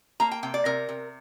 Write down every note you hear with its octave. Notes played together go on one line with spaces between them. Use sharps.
A#3 A#5
G5
C3 G5
D5
C3 A#4
C3